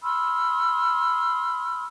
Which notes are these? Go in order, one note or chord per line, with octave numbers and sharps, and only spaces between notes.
B5 C6 E6 F6